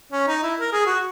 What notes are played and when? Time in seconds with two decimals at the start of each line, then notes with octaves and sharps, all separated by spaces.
0.12 C#4
0.28 D#4
0.43 E4
0.60 A#4
0.73 G#4
0.86 F#4